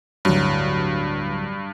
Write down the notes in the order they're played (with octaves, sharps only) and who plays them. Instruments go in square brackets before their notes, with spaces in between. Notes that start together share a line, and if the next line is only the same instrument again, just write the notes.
[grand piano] D1 F#3 [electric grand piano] G2